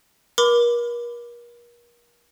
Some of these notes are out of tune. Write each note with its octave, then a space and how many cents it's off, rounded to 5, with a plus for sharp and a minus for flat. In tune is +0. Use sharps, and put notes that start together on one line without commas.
A#4 +40 B5 +30 D6 +0